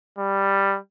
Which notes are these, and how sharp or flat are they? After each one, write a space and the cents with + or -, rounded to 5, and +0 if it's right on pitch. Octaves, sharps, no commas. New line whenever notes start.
G3 +5